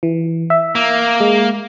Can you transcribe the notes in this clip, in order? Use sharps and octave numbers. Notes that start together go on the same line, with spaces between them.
E3
E5
A#3
G#3